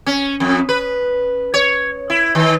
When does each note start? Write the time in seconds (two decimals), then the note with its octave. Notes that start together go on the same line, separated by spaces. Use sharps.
0.07 C#4
0.40 F2
0.69 B4
1.54 C#5
2.10 E4
2.35 D#3